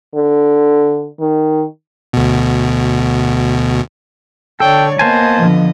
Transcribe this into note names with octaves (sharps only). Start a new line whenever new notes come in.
D3
D#3
D2 B2
D3 A4 C#5 D5 G5
A#3 B3 C5 D#5 G#5 A5
D3 F3